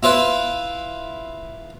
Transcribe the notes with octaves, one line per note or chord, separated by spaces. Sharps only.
E4 F4 B4